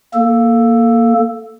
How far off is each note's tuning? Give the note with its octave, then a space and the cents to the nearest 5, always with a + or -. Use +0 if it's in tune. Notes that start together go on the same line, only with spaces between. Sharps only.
A#3 +0 A4 +0